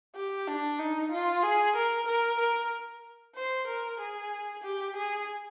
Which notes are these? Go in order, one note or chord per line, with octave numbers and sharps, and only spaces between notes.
G4
D4
D#4
F4
G#4
A#4
A#4
A#4
C5
A#4
G#4
G4
G#4